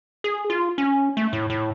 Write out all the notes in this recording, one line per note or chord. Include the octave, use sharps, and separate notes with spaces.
G#4
F4
C#4
A3
A2
A2